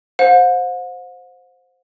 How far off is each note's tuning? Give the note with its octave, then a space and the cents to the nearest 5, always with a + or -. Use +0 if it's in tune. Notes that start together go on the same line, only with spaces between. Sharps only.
C5 +0 F#5 -45